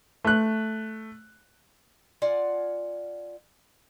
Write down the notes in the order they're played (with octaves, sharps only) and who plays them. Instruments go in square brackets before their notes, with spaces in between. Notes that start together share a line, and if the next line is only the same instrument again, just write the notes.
[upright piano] A3 F#6
[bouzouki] F4 D5 F#5 G#5